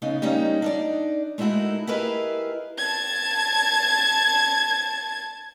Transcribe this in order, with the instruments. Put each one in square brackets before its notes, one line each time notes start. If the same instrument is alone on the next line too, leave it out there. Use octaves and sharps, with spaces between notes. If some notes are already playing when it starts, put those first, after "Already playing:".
[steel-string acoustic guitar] C#3 B3 D#4
G3 A#3 C#4 D#4
D4 D#4 D5
G#3 A3 D#4 E4 F#4 A#4
E4 G4 G#4 A#4 B4 D#5
[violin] A5 G#6